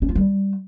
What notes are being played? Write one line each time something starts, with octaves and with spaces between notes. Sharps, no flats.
C#4
F4
G3